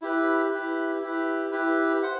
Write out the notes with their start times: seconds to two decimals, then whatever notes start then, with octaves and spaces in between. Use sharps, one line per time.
0.02 E4 G4 B4
0.52 E4 G4 B4
1.02 E4 G4 B4
1.52 E4 G4 B4
2.03 C5 F#5